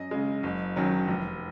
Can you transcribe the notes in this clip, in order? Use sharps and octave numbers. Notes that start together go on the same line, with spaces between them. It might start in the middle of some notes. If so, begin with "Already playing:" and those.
Already playing: F#2 D#5
C#3 G#3
F#1
F#2 D#3 F#3
F1